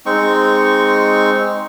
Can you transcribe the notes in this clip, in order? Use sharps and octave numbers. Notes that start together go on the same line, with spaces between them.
G#3 C4 D#4 C#6